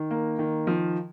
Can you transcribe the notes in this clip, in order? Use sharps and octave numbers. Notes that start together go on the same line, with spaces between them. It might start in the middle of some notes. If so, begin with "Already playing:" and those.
Already playing: D#3
A#3
D#3
F3